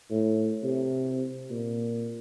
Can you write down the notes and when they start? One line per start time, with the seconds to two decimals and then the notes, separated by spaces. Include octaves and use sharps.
0.11 A2
0.64 C3
1.50 A#2